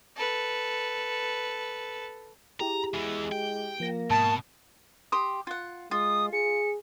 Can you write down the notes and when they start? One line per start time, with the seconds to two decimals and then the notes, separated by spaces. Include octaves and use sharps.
0.16 A4 B4
2.60 E4 G4 G#4 A#5
2.94 E2 E3 G#3
3.32 G5
3.80 F3 A#3 A#6
4.10 G#2 B2 A5
5.12 G4 C6 D#6
5.47 F4 F#5
5.91 G#3 F4 D#6
6.33 G#4 C#7